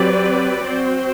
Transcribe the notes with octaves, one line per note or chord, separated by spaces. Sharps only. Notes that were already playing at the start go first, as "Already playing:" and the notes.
Already playing: F#3 C4 G4 B4 D5
C4 F#4 C5